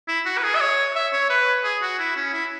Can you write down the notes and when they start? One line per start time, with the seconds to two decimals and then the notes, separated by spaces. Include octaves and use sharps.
0.08 E4
0.26 F#4
0.38 B4
0.44 G#4
0.56 E5
0.61 C#5
0.96 E5
1.13 C#5
1.30 B4
1.64 G#4
1.82 F#4
1.99 E4
2.17 C#4
2.33 E4